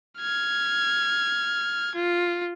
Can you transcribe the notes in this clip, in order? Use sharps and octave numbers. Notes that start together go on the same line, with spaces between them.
F6 G#6
F4